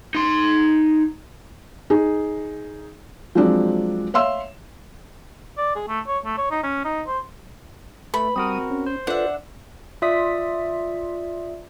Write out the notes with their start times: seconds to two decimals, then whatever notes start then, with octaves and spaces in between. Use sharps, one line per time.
0.15 D#4 C6
1.90 D#4 G#4
3.35 F3 F#3 G#3 C4 D4
4.14 C#5 E5 F5 C6 E6
5.57 D5
5.75 G#4
5.88 A3
6.07 C#5
6.25 A3
6.38 C#5
6.51 D#4
6.63 C#4
6.84 D#4
7.07 C5
8.14 A3 B4 B5
8.36 G3 C4 F#4 A#4 D#6
8.70 C#4
8.86 C5
9.07 D4 F4 A4 B4 E5 F#5
10.02 F4 D5 E5 C6 D#6 B6